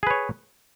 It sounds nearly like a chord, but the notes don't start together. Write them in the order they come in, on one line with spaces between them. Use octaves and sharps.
G#4 B4 C#5